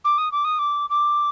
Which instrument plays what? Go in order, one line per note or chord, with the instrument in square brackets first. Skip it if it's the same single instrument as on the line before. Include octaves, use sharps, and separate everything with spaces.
[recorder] D6
D#6
D6
D#6
D6
D6